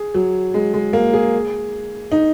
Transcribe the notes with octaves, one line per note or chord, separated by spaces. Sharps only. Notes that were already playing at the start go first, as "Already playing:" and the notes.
Already playing: G#4
F#3
G#3
G#3
A#3
G#4
D#4